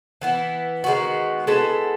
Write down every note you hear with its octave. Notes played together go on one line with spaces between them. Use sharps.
E3 B3 E4
D#3 G#3 B3 F#4
G#3 B3 E4 A4